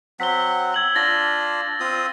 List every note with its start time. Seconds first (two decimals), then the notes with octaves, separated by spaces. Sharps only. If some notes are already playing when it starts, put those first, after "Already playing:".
0.20 F#3 C4 F#5 B6 G7
0.74 E6 G#6 F#7
0.95 D4 F4 A6 A#6
1.80 C4 F4 D#6